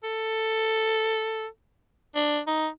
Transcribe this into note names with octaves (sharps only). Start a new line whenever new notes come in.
A4
D4
D#4